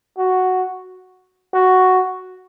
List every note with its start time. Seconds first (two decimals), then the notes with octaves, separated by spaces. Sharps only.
0.18 F#4
1.54 F#4